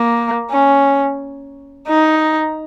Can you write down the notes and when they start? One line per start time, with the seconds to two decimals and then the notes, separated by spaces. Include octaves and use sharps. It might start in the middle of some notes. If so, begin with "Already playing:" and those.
Already playing: A#3
0.51 C#4
1.88 D#4